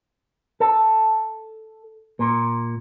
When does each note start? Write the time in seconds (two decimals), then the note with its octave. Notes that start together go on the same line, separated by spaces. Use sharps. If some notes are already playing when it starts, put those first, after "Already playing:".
0.60 A4
2.19 A#2